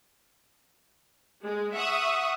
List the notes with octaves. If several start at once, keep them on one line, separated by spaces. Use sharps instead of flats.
G#3
E5 F#5 C#6 D#6